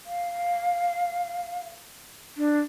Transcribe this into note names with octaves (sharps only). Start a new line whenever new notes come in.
F5
D4